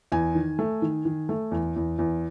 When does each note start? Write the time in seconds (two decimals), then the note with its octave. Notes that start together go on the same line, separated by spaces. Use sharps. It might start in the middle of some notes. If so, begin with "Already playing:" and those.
0.12 E2 G#5
0.35 D#3
0.59 A3
0.82 D#3
1.05 D#3
1.29 A3
1.51 E2
1.76 E2
1.99 E2